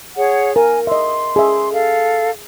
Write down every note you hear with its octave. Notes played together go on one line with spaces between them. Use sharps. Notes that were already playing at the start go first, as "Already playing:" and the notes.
G#4 C#5 F#5
A#4 G#5
D#5 E5 C6
G#4 E5
A4 F5